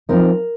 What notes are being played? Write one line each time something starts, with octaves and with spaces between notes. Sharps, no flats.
F3 C4 D#4 A#4